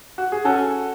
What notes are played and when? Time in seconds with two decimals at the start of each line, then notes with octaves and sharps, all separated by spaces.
0.18 F#4
0.32 G#4
0.45 C#4 F#4 A4